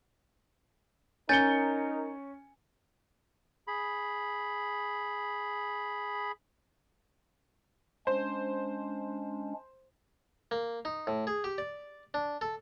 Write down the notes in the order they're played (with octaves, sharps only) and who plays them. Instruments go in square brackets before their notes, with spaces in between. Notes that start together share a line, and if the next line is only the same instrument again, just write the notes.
[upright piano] C#4 C#7 G7 [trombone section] D#4 A#4 [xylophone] G#5 G6 A6
[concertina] G#4 B5
[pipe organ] G#3 C#4 D4 [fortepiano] C5
[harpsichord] A#3
D#4
A2
G#4
G4
D5
D4
A4